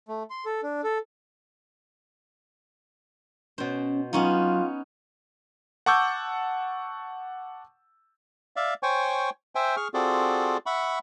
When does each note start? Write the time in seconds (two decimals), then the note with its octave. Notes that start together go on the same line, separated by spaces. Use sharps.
0.08 A3
0.30 C6
0.46 A4
0.63 D4
0.84 A4
3.58 B2 C#4 C5
4.13 F#3 B3 C#4 D#4 F4
5.86 F#5 A5 C#6 D6 E6 G6
8.56 D5 E5 F5
8.83 C5 C#5 G5 G#5 C#6
9.55 C5 E5 G5 G#5
9.77 G#4 C#6 F6
9.94 C4 F4 F#4 G#4 A4 D5
10.66 E5 F#5 B5 C#6